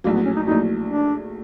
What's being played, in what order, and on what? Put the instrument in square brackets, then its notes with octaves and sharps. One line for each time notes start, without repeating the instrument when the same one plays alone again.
[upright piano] A#1 A2 F#3 [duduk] A#3
[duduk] B3
C#4
D#4
[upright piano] A#1 A2 F#3 [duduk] D#4
[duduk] D4